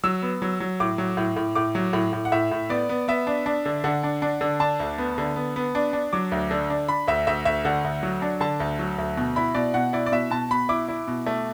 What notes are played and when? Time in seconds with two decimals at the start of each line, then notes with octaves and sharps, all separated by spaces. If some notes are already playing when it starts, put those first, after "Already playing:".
0.04 F#3 E6
0.22 B3
0.42 F#3
0.60 F#3
0.80 A2 D6
0.98 F#3
1.17 A2
1.37 A2
1.55 A2 D6
1.75 F#3
1.93 A2
2.13 A2
2.25 F#5
2.32 A2 E5
2.51 A2
2.69 B3 D5
2.89 B3
3.08 B3 E5
3.27 D4
3.46 D4
3.66 D3
3.84 D3 F#5
4.04 D4
4.22 D4
4.41 D3
4.60 D4 A5
4.80 D2
4.98 B3
5.18 D3
5.36 B3
5.56 B3
5.75 D4
5.93 D4
6.13 F#3 D6
6.32 D2
6.51 D3
6.70 D4
6.88 D4 B5
7.07 D2 E5
7.27 D2 E5
7.45 D2 E5
7.65 D3 F#5
7.84 D2
8.03 F#3
8.22 D4
8.41 D3 A5
8.60 D2
8.79 F#3
8.98 D2
9.17 B2
9.36 E4 B5
9.55 B2 D5
9.74 B2 F#5
9.93 E4 D5
10.06 D5
10.12 B2 E5
10.31 B2 A5
10.51 B2 B5
10.69 E4 D6
10.88 E4
11.07 B2
11.26 A3